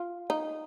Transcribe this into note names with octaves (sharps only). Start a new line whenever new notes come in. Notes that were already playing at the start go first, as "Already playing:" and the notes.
Already playing: F4
D#4